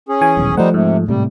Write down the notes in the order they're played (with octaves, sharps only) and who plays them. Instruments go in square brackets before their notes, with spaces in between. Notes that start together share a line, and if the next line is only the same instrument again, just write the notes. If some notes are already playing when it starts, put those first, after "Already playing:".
[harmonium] C#4 G#4
[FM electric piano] E3 G#5
[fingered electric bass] D#1 B1
[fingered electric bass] F3 A3 [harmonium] G3 D#4 C5 [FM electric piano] F#5
[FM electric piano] G#2 [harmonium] C3
[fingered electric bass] A2 C3 [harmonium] G3